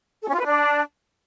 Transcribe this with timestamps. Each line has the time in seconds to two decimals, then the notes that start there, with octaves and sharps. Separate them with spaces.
0.22 A4
0.28 C#4
0.34 F4
0.40 B4
0.45 D4